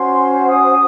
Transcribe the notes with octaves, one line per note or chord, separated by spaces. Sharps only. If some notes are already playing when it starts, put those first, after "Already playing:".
Already playing: C#4 F#4 C5 C6
D#6